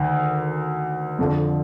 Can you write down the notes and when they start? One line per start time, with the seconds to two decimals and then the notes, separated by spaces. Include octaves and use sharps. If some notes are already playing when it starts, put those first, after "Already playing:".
Already playing: D2 D#3
1.19 F2 D3 F3